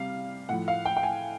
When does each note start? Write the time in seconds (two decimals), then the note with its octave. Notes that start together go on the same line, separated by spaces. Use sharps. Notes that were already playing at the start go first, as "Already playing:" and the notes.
Already playing: C3 G3 F5
0.49 A2 F3 F#5
0.68 F5
0.85 G5
0.97 G5
1.03 G#5